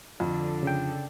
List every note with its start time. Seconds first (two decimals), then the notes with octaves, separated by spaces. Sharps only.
0.20 F2 D3 D4 A4
0.63 C#3 G5